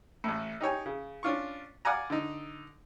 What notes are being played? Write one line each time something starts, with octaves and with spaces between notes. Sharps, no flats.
A1 A2
D#4 G4 C#5 G#5
C#3
C#4 D4 F4 C#6
D5 F5 F#5 G#5 A#5
D3 D#4